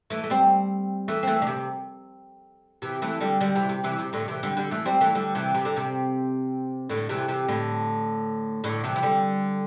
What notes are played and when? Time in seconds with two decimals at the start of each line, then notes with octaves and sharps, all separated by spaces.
0.10 E3 A3
0.24 A3
0.30 G3 C4
1.08 E3 A3
1.23 C4
1.27 E3 A3
1.42 D3
1.47 C3
2.82 C3 E3
3.02 E3 A3
3.21 D3 G3
3.41 D3 G3
3.55 C3 E3
3.69 C3
3.84 C3 E3
3.99 C3
4.13 A2 D3
4.28 C3 E3
4.43 D3 G3
4.57 D3 G3
4.71 E3 A3
4.86 G3 C4
5.01 E3 A3
5.15 D3 G3
5.35 C3 E3
5.54 C3
5.65 D3
5.77 C3
6.90 A2 D3
7.09 C3 E3
7.28 C3 E3
7.48 A2 D3
8.64 A2 D3
8.84 C3 E3
8.96 E3
9.03 D3 G3